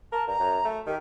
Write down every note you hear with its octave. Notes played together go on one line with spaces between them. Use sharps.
A#4 A5
G2 A#5
F#2
A3
D#3 G4